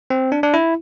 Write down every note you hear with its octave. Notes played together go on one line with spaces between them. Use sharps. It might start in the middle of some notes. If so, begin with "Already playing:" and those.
C4
D4
D4
E4